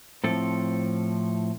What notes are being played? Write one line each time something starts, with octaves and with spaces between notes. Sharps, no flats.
A2 F3 C4 A4